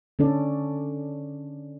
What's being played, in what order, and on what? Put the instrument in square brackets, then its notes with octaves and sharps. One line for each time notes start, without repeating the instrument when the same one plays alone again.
[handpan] D3 C#4 D4 A4 D5